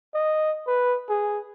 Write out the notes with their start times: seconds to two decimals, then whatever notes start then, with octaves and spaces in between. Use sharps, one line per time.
0.14 D#5
0.67 B4
1.09 G#4